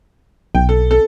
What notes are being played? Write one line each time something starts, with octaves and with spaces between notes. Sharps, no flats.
B1 G5
A4
A4